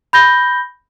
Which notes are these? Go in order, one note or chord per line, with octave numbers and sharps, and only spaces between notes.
B5 G6 A#6 G7